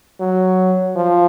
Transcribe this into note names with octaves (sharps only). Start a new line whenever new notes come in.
F#3
F3